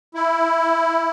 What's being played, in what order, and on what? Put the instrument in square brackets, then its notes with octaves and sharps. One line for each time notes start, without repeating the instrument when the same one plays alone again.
[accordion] E4